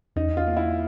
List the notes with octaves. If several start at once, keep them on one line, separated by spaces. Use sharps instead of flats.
E2 D#4
F4
A#3
E4